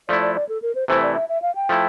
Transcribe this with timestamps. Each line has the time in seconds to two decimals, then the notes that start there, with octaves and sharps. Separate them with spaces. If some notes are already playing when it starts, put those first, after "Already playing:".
0.08 F3 A3 E4 D5
0.21 D5
0.35 D5
0.49 A4
0.62 A#4
0.75 C5
0.88 C3 E3 A3 E4 C5
1.02 D5
1.15 E5
1.29 E5
1.42 F5
1.55 G5
1.69 F3 A3 E4